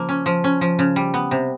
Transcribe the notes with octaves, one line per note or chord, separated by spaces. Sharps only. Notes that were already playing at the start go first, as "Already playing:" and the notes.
Already playing: C#3 F3 A#3
C#4
F3
C#4
F3
C#3
G3
B3
C3